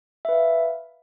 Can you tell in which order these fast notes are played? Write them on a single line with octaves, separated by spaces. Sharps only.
E5 B4 F5